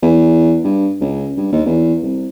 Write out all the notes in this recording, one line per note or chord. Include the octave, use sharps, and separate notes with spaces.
E2
G2
C#2
G2
D#2
E2
C2